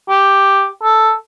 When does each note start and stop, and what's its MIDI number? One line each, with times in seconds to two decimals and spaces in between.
0.09 0.66 67
0.83 1.13 69